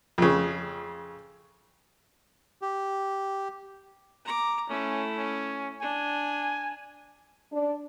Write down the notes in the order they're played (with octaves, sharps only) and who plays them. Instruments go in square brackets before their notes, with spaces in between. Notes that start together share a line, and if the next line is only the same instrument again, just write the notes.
[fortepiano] F2 C#3
[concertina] G4
[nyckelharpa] A#5 D6
[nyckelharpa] A3 E4 [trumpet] C#4
[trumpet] C#4
[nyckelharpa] D4 [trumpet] G#5
[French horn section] D4